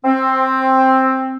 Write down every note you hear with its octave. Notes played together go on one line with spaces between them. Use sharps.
C4